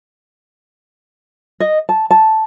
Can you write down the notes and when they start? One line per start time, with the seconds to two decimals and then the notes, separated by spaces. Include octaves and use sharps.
1.60 D#5
1.89 A5
2.11 A5